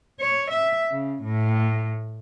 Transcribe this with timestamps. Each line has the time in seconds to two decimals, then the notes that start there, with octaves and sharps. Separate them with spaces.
0.20 C#5
0.51 E5
0.91 C#3
1.24 A2